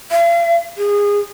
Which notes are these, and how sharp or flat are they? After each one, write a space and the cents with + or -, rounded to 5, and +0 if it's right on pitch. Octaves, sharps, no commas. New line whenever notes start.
F5 -45
G#4 -25